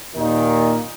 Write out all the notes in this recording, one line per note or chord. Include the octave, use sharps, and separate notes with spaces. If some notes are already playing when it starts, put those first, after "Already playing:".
D#2 A#2 D#3 D#4